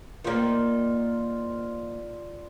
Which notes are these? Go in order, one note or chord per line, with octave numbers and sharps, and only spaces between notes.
D#3 A#3 F4 C5 D5